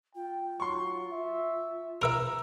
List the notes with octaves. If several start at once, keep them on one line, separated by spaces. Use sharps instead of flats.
F4 G5
F#3 C6 C#6
E5
A#4 B4 E5 A#5 E6 D7